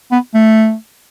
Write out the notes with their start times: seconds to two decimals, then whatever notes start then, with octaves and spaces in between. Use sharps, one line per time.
0.12 B3
0.34 A3